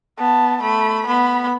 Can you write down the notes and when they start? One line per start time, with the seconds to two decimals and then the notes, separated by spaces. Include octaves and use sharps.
0.18 B3 A5
0.62 A3 B5
1.07 B3 B5